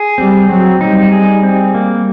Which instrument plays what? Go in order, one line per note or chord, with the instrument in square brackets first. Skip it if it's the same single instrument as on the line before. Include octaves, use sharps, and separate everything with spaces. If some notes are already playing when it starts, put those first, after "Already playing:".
Already playing: [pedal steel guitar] G#4
[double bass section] G3 [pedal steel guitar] C4
[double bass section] F#3 [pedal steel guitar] C4
[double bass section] G3 [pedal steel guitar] D#4
[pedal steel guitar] G#4
C4
A#3